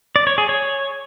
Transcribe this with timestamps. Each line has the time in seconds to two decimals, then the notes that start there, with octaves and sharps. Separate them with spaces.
0.16 D5
0.27 C#5
0.38 G#4
0.49 C#5